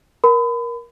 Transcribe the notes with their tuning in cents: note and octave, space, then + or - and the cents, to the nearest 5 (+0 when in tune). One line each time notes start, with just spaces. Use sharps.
A#4 +20 B5 +35